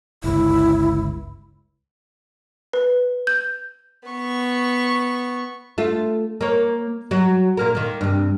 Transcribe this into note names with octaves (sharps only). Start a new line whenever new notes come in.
G1 C#2 E4
B4
G6
B3 C#6
A3 F4
A#3 C#5
F#3
A#2 A#3 A#4
D#3 A#3
G2 C3